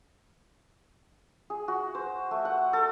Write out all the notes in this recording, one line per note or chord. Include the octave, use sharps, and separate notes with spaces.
G#4
F#4
C5
A3
F#5
A4